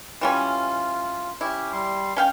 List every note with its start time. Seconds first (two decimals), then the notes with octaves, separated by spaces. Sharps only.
0.21 E3 G3 C#4 F4
1.41 C#4 E4 G4
1.72 G3 C6
2.16 C#4 F5 G5